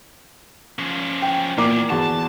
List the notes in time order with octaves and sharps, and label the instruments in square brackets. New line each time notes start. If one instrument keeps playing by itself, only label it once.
[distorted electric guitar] F3 C#4
[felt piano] G5
[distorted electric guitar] E2 [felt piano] A#2 A#3 D6
[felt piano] E2 F#4 [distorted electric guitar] A5